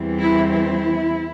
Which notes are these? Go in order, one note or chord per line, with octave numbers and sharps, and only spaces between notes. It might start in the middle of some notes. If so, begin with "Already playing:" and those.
Already playing: E2 E3 G3 C4
E4
E4